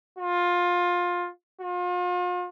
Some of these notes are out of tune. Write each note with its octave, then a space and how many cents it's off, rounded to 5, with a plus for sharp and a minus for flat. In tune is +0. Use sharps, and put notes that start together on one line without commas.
F4 +15
F4 +40